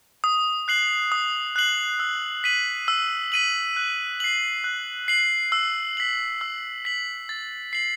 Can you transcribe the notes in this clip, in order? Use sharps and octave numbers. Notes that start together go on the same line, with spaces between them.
D#6
F#6 C7 F#7
D#6
F#6 C7 F#7
E6
B6 D#7 F#7
E6
B6 D#7 F#7
F#6
C7 F#7
F#6
C7 F#7
E6
B6 F#7
E6
B6 F#7
A6
C7 F#7